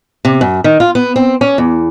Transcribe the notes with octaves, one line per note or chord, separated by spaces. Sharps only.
C3
F#2
D#3
F4
B3
C4
C#4
E2